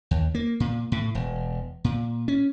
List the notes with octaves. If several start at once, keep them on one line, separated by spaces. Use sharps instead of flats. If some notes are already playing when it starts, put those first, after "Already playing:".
D#2
A#3
A#2
A2
E1
A#2
C#4